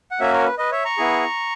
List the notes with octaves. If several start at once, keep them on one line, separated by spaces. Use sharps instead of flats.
F#5
A#3 C#4 F#4 C#5 E5
A#4 C#5
B4
B4 D#5
C#5 E5
A#5 C#6
B3 E4 G#4